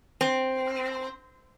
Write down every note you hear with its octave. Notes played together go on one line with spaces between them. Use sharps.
C4